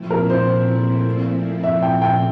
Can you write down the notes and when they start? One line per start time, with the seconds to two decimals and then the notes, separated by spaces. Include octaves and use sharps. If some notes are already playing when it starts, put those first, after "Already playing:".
Already playing: A#2 F3 A3 C4 E4
0.10 A#4
0.30 C5
1.64 E5
1.82 G5
2.02 G5